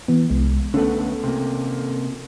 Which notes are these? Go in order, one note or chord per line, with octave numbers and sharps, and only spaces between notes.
E3 B3
C2 G#3
D3 A3 B3 C#4 A4
C3 A#3